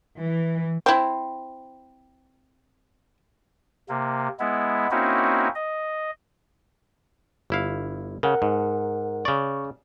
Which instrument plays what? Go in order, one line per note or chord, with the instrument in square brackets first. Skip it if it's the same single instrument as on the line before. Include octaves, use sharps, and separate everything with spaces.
[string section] E3
[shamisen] C4 E4
[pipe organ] C3 A#3
G#3 B3 E4
A#3 C4 C#4 D#4 E4 F#4
D#5
[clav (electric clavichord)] G1 E4 F5
[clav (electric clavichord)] C#3 [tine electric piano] A#4 F#5
[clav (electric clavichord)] G#2
[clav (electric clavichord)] C#3 D5 [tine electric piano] C#6